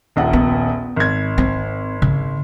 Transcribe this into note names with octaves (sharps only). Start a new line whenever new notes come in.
D#1 A#1 F#5
B3
G#1 G#6
C4
C#3